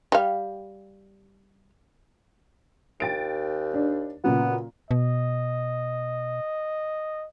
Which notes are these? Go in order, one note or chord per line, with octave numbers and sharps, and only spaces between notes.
G3 F5
D#2 G5 A6 D7
D4
A#2 C#3 F#3 B3
B2 D#5